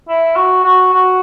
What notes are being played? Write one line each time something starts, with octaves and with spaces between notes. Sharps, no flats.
E4
F#4
F#4
F#4